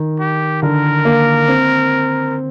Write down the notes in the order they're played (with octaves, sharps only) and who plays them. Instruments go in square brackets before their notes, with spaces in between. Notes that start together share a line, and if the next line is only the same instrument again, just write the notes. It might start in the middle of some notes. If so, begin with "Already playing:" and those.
Already playing: [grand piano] D#3
[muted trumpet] G4
[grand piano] D3 [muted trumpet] A#4
[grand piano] A#3
C4